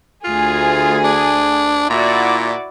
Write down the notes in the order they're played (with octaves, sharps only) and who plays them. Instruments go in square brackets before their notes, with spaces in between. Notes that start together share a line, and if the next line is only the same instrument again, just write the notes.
[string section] D2 G#4 [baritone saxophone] F4
[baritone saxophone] D4
[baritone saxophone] A#2 [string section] E4 F#4 D5